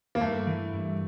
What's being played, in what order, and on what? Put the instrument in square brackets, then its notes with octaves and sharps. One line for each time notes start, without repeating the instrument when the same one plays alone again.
[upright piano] A#3
[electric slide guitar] G2 [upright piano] A3
[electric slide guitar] E3
G2